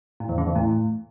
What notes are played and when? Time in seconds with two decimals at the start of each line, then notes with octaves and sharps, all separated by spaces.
0.20 A2
0.29 E2
0.38 C#3
0.47 E2
0.56 A2